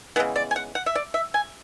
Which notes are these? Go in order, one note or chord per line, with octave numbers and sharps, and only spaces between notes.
C#3 E3 G#3 B3 F#5
D5
G#5
F#5
F#5
E5
D5
E5
G#5